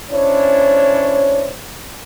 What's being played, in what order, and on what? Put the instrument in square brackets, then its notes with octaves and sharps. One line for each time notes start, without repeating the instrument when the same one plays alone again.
[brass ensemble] C#4 D4 E4 C5 C#5